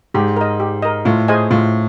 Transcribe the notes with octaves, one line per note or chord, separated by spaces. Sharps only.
G#2 G4
A#4 D#5
G4
A#4 D#5
A2 F4
G#4 C5 D#5 G#5
A2 F4